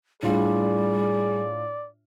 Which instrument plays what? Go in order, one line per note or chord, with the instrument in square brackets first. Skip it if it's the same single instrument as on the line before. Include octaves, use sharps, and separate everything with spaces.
[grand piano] A2 D4 F4 [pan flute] G3 [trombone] G#4 [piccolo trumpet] D5